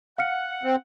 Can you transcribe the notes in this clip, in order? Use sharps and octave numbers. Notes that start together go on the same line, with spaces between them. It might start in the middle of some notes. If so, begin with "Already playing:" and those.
F5 F#5 F6 C#7
C4